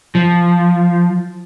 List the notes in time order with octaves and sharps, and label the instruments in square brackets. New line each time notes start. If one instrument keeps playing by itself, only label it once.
[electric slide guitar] F3